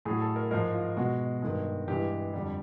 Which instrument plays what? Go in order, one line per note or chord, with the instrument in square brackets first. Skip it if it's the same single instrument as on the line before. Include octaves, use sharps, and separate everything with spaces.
[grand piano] A2 F#3 G#4
A4
A#4
G#2 F3 G#3 A#4
F4
B2 G#3 F#4
G2 D#3 G#3
G2 E3 G#3 G4
F2 D3 G3